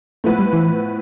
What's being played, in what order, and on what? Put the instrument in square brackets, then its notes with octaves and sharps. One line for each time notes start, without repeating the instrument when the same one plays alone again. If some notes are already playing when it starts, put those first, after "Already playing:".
[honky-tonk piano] A2 F3 B3 E4 B4 [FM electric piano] A3
[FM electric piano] G3
E3